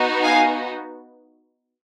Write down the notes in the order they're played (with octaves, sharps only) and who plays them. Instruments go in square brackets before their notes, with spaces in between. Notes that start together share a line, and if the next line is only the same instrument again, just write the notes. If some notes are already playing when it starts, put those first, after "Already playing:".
Already playing: [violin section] B3 D#4 F#4
F5 G#5